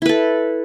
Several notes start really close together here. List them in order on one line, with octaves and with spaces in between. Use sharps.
E4 B4 A4